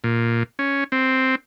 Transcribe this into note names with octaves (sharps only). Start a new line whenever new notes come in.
A#2
C#4
C4